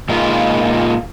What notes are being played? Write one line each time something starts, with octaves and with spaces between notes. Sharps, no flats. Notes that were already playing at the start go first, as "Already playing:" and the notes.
A#2 G#3 D#4 F4 A#4 B4